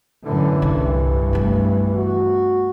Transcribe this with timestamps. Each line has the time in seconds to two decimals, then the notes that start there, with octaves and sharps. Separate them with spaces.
0.25 F#2 A2 D3 E3
0.62 C2 G2
1.33 A3 B3
1.95 F#4